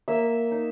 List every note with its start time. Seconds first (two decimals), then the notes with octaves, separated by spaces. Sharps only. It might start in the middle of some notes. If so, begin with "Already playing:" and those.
0.08 A#3 E5
0.51 D#4